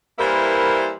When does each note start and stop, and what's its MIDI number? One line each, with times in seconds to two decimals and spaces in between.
0.19 0.92 52
0.19 0.92 55
0.19 0.92 58
0.19 0.92 64
0.19 0.92 70
0.19 0.92 72